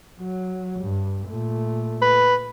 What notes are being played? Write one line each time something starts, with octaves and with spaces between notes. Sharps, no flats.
F#3
G2
A#2 A3
B4